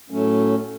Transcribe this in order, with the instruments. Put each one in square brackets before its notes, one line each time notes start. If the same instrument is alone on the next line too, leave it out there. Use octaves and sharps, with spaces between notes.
[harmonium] A2 F#3 A3 C#4